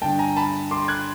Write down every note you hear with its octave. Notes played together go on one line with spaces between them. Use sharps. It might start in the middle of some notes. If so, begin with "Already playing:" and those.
G2 D3 G5 A5
G#5 A#5
A5 B5
C6 D6
F#6 G#6